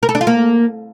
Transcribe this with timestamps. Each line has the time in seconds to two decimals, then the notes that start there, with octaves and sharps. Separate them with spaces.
0.03 A#4
0.09 A4
0.15 D4
0.21 F4
0.27 A#3